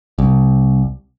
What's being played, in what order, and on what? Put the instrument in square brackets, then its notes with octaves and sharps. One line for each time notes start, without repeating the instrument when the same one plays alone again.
[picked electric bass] C2